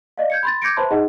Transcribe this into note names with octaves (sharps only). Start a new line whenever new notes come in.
D5 D#5 F5
G6 G#6 C#7
B5 C6 A6
D6 G6 G#6 A#6 C#7 D7
B4 C5 E5 A5 B5 C6
D#4 G#4 D#5 F#5